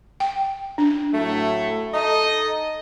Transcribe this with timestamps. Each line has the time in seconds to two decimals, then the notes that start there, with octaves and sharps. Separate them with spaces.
0.20 G5
0.78 D4
1.13 A2 F#3 A3
1.94 D#4 A4 D#5